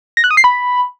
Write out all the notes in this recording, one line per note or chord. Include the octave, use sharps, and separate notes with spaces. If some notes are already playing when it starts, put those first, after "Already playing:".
A#6
F#6
D#6
C7
B5